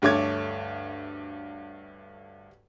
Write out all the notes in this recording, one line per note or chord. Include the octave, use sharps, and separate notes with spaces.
D2 G2 A3 C#5 D6 G#6